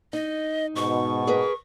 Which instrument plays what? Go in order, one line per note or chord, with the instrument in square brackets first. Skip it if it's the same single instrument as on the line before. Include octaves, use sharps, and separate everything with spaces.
[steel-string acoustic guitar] D#4 [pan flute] D#5
[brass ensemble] G#2 B2 [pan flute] C#6
[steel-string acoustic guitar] G#4 A#4 B4